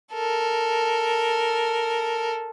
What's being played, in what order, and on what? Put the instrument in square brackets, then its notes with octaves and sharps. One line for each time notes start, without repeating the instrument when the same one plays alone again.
[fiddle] A4 A#4